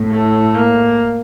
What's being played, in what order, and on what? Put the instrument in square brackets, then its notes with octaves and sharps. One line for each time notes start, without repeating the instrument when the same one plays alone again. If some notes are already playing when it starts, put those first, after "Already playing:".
Already playing: [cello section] A2
[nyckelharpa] A3
A#3